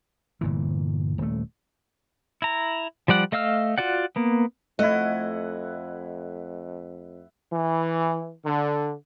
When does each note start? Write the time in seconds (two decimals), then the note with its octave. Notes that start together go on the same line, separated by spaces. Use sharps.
0.41 G1 A#2 E3
1.18 D#1 A3
2.42 E4 A#5
3.08 F3 G3 D5 F#5
3.32 A3 D#5 F5 E6 F6
3.78 F4 F#4 D5 F#5
4.16 A#3 B3
4.79 F2 A3 E4 D#5 F#5
7.53 E3
8.45 D3